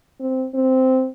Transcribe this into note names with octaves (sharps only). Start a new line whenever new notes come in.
C4
C4